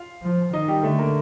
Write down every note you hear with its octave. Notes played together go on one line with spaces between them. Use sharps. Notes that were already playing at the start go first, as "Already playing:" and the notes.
Already playing: F4 F5
F3
D#3 D#4 D#5
G3 G4
D3 A3 A4
A#3 A#4